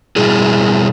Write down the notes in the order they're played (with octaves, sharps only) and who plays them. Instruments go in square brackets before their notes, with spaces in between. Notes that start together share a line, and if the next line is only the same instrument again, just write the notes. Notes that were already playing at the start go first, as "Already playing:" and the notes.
[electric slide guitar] B2 G3 E4 G#4